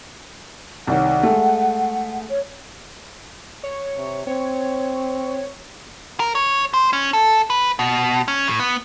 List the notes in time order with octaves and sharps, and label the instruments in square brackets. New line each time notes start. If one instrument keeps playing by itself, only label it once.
[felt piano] C2 D#3 C#5 [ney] F#5
[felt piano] G#3 A3
[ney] C#5
[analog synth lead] C#5
[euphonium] C3
[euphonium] C4 [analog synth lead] C#5
[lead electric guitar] A#4
C#5
C5
C#4
A4
B4
B2
C#4
A2
B3